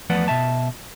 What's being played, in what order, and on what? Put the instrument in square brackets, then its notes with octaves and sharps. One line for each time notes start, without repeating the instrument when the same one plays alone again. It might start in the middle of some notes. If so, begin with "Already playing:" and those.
[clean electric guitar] E2 F3 A3 B4 D5 F#5
B2 E5 A5